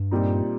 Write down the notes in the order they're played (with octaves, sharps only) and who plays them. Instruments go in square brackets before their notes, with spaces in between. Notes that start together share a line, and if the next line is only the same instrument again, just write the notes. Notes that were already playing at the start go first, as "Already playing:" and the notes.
Already playing: [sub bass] G2
[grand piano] A#2 G3 C4 D#4